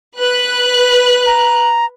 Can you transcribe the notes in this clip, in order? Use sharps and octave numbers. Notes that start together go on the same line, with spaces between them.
B4 F#6
A#5